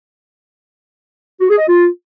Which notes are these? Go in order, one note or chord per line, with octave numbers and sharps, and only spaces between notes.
F#4
G#4
D#5
F4